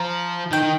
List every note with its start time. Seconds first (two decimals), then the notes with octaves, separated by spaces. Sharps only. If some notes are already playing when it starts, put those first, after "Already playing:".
Already playing: F3 A#5
0.52 D#3 G5
0.63 D#3